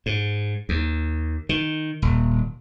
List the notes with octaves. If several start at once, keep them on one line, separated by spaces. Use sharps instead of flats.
G#2
D#2
D#3
D#1